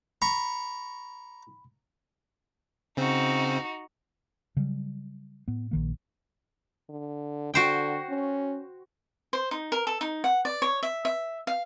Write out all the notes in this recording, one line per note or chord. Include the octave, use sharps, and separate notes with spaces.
A#5 B5 C#6
C#3 C4 D#4 F#4
C#3 F#3 G3
A2 B3
A#1 D#3 A#3
D3
D3 F#4 C5 G5
C#4
C5
D#4
A#4
A4
D#4
F#5
D5
C#5
E5
E5
F5